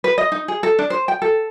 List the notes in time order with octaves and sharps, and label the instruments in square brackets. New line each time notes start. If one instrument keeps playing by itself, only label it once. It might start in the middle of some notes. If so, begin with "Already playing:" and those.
[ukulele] B4
D#5
D#4
G#4
A4
D4
C5
G5
A4